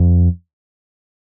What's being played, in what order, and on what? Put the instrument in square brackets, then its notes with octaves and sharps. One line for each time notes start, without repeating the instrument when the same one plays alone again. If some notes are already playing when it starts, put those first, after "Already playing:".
Already playing: [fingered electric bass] F2